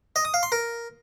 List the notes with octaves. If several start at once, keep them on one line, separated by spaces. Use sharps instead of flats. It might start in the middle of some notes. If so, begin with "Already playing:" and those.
D#5
D#6
F5
C6
A#4